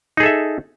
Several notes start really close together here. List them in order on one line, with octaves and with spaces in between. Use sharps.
D#4 G#4 A4 E5